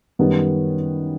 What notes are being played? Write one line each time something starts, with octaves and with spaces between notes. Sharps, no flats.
F#2 D#3 G3 B3